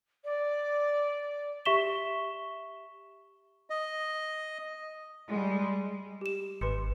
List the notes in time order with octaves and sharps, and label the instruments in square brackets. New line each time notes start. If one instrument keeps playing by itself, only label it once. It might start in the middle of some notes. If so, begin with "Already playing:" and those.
[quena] D5
[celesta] G4 E5 C#6 B6 E7 G7
[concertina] D#5
[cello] G3 G#3
[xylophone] G4 E7
[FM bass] G#1 [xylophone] B4 C6 C#7